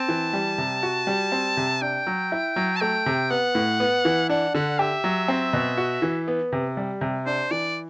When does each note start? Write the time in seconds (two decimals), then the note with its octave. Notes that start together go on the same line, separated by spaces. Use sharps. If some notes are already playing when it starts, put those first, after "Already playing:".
Already playing: C4 A5
0.09 E3
0.33 G3
0.58 C3
0.83 F#4
1.07 G3
1.32 C4
1.57 C3
1.82 D4 G5
2.07 F#3
2.32 E4
2.56 F#3
2.76 A5
2.81 A3 G5
3.06 C3
3.30 B3 F#5
3.55 A2
3.80 B3
4.05 E3
4.29 D4 F#5
4.54 D3 F#5
4.79 G4 E5
5.04 F#3
5.28 C4
5.53 B2
5.78 F#4
6.02 E3
6.28 B3
6.52 C3
6.77 G3
7.01 C3
7.26 D4 C5
7.51 E3 D5